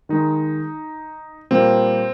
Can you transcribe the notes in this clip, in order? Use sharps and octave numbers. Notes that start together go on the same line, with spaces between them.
D#3 G#3 D#4
A#2 G3 A#3 C4